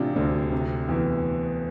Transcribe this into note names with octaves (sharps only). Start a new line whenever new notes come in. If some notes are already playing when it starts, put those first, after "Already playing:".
Already playing: A1 C3 D4 F4
D2
C3
E2